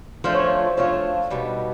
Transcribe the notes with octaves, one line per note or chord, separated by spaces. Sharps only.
F3 A3 D4 F4 C5
C#5
C5
F3 A3 D4 F4 C#5
B2 G3 B3 D#4